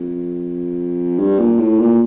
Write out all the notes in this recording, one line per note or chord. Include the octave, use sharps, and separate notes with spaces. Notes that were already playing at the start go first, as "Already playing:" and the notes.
Already playing: F2
G2
A#2
A2
A#2